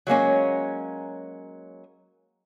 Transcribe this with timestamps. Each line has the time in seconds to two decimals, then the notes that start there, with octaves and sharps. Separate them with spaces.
0.07 F#3 G#3 A#3 C#4